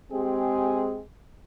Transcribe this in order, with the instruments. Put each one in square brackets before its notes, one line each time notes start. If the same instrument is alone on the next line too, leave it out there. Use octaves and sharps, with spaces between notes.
[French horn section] G#3 C4 G4 G#4